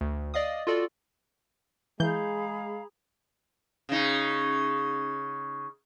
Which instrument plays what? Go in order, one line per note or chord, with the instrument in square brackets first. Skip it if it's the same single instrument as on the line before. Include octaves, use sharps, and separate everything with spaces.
[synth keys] D2
D5 D#5 F5 D#6
F4 F#4 A4 D5
[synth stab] E3 G6 [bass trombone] G#3 [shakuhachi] G#4 [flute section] F5 A#5 B5
[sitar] C#3 D#4